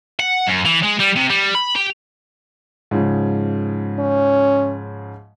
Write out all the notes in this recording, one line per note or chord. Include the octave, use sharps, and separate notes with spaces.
F#5
F#2
E3
G#3
G3
C3
G3
B5
G4
G#2 C#3 F3
C#4